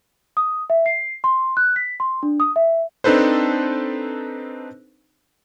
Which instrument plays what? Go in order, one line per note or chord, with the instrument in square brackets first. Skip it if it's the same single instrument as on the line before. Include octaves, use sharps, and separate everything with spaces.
[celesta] D#6
E5
C7
C6
F#6
B6
C6
D4
D#6
E5
[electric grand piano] C4 D4 D#4 A4 B4 C5